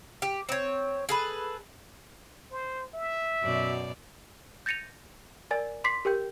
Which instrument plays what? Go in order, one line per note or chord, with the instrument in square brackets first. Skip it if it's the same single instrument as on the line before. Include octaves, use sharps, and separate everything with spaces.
[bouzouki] G4
C4 C#5
G#4 A4 B4
[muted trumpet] C5
E5
[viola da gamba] F#2 B2 D5
[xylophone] G6 A6 A#6 C#7 D#7 F7
A#4 D5 G#5 A6
C6 D6 B6 C7
G4 A#4 G5 G6